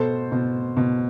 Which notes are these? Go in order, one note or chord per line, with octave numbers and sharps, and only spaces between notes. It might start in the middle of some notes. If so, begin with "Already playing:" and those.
Already playing: B2 A4 C5
B2
B2